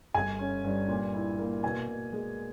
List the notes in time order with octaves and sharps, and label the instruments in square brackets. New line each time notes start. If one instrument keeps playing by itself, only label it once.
[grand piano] G1 [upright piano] G#5
[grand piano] C#4
G2
A#2
E4
A#3
[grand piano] B2 [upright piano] G#5
[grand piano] B2
G#3